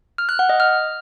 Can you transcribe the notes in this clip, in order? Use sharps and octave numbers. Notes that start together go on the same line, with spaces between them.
F6
F#6
F#5
D#5
F6